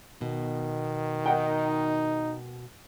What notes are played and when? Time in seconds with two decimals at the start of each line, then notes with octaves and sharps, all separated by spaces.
0.21 B2 D#3
1.26 D#4 A#4 F#5 G5